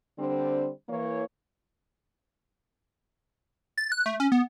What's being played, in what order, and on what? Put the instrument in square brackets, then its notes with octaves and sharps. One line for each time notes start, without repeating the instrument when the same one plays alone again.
[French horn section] D3 G3 C4 D4 C5
E3 A#3 C#5
[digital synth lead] A6
F#6
A3
C#4
B3